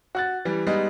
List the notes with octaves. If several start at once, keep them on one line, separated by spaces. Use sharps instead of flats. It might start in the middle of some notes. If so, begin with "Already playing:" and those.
F#4 F#6 A6
E3 G3
G3 G#3 B3 D#4